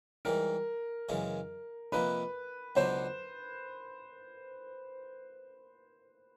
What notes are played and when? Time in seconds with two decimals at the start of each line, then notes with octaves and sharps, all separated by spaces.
0.25 G#2 E3 G3 A#4
1.09 F#2 C#3 E3 G#3
1.92 C3 F3 A#3 D#4 B4
2.76 C#2 B2 F#3 B3 D4 C5